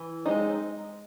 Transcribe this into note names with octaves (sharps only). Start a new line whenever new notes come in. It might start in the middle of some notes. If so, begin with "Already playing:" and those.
Already playing: E3
G#3 C4 D#4